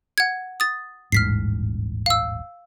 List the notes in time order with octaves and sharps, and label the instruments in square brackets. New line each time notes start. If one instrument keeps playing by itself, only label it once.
[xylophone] F#5 G#6
D#6 A6
[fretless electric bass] D#1 A1 G#2 [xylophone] F6 B6 C7
[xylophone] F5 E6